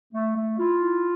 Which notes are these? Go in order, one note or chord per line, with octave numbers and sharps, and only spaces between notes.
A3
A3
E4 F4
E4